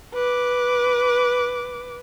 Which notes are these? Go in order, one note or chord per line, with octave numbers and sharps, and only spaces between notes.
B4 D6